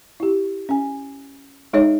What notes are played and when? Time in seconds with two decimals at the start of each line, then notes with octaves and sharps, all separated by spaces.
0.20 E4 G4
0.69 C#4 G#5
1.73 G#3 D#4 G#4 C#5 D#5